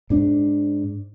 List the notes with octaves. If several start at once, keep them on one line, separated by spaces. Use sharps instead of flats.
G#2 D4